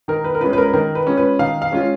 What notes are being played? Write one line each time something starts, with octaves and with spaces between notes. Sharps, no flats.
D#3 A#4
B4
A#4
G#3 C#4 F4 B4
B4
A#4
B4
D#3 A#4
B4
G#3 C#4 F4
B4
D#3 F5
F5
G#3 C#4 F4